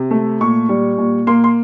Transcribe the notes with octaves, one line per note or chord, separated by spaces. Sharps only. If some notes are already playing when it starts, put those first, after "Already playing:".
Already playing: C3
A3
A#2 C#6
G3
A#2
A#3 C6
C6